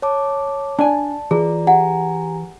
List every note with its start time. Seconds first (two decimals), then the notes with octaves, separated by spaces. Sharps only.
0.02 C#5 A5 D6
0.79 D4 D5 G#5 A5
1.31 E3 F4 G#4 D5 A#5
1.67 G4 F#5 G#5 A#5